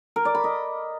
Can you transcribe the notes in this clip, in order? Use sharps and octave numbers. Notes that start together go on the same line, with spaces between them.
A#4
D5
B5
D#5